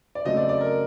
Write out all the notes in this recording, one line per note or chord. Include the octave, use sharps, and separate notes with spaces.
D5
C#3 F#3 A3 C4 D#5
D5
D5
A#4